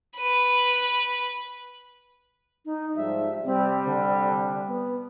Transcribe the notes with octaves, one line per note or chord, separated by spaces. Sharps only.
B4
D#4
G#2 F3 G3 E5
C3 G3 C4
D3
B3